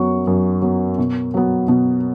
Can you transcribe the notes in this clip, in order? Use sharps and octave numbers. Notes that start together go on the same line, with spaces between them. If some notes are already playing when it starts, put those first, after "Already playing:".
Already playing: F#2 F#3 B3 C#6
F#2
F#3 B3
B2
F#3 B3
B2